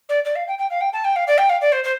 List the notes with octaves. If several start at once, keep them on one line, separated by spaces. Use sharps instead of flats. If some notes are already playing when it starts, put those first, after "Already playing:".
D5
D5
F5
G5
G5
F5
G5
A5
G5
F5
D5
G5
F5
D5
C5
C5